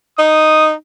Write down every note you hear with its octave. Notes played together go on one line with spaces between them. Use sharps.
D#4 D#6